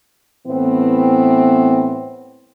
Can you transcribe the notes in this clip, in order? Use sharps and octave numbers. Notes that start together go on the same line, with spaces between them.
A2 E3 B3 C4